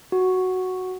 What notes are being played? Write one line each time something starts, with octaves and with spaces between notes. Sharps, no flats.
F#4